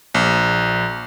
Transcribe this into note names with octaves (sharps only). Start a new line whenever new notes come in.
A#1